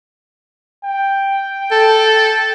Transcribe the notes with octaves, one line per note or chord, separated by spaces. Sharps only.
G5
A4